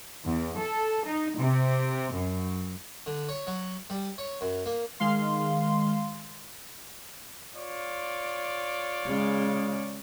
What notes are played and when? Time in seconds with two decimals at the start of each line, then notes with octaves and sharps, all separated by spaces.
0.25 E2
0.59 A4
1.06 D#4
1.38 C3
2.13 F#2
3.06 D3
3.29 C#5
3.47 F#3
3.90 G3
4.18 C#5
4.41 F#2
4.66 A#3
5.00 D#3 G#3 F5 C6
7.56 F4 C#5 D5
9.06 C#3 G#3